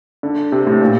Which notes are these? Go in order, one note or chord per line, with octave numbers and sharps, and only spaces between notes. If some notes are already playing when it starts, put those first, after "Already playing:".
D3
C3
A2
A#2